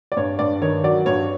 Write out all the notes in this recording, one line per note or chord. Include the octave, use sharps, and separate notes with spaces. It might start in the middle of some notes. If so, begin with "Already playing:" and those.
D5
G2 C#5
G2 D5
D#3 C#5
F#3 D5
G2 C#5